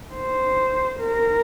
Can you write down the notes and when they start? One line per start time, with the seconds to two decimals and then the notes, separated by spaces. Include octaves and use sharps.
0.14 C5
1.00 A#4